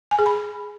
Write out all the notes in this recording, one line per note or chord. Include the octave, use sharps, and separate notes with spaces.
G#5
G#4
B5